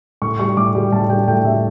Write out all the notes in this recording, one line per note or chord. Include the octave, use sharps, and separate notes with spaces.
A2 C#6
G3 C#6
A2 D6
G3
A2 A5
G3 G5
A2 G5
G3 E5